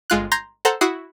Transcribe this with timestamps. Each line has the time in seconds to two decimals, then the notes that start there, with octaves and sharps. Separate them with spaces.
0.10 G1 G#3 F4 F#6
0.32 A#5 C6 G6 G#6 A#6
0.65 A4 C5 F#5 A#5 C6 F#6
0.81 E4 F#4 F#5 D#6 C7